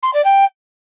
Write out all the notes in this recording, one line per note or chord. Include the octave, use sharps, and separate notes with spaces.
C6
D5
G5